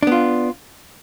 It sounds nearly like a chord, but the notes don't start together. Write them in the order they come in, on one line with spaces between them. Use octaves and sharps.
D4 B3 F4